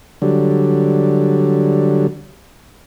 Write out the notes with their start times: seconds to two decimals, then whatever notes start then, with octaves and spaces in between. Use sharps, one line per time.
0.22 D3 F#3 G3